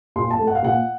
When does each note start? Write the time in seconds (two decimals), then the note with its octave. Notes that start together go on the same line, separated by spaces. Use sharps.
0.16 A#2 C6
0.31 A5
0.39 A3
0.47 F#5
0.55 F5
0.63 A#2 F#5